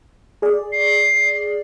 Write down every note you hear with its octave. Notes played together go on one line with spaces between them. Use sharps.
G#4 D5
C7